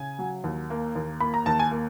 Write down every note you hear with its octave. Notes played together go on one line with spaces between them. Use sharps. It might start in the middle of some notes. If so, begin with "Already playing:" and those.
Already playing: C#3 G#5
F#3
D#2
A#3
D#2
A#3 B5
A#5
D#2 A5
G#5
A#3